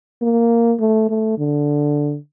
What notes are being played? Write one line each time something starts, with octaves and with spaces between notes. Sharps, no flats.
A#3
A3
A3
D3